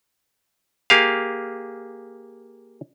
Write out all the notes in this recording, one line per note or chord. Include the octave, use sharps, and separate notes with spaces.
A#3 G4 G#4 F5